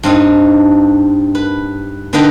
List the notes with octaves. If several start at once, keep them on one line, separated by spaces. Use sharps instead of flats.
G2 C4 D#4
B4
D3 D4 D#4 B4 G5 A#5